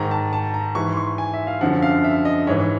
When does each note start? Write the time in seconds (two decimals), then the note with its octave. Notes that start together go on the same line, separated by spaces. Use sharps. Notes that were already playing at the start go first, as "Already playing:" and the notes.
Already playing: G#2 D#3 A#5
0.11 A5
0.33 A5
0.54 A#5
0.75 G#2 E3 C#6
0.92 C6
0.97 C#6
1.18 G#5
1.34 E5
1.47 F5
1.61 F#2 D3 F3 F#5
1.82 F5
2.04 E5
2.25 D#5
2.47 G#2 E3 C#5